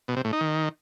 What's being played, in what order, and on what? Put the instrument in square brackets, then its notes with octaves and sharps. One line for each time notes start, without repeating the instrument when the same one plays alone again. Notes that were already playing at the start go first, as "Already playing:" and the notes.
[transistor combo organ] B2
C3
A2
D#4
D#3